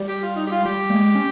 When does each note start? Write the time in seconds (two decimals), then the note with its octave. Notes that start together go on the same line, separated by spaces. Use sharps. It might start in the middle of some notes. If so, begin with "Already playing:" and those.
Already playing: G3
0.08 G4
0.22 F4
0.36 D#4
0.47 G4
0.51 F4
0.65 G3 G4
0.90 A#3
0.94 G#3
1.15 C#4